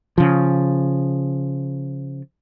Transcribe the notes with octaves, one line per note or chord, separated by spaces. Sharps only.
C#3 F3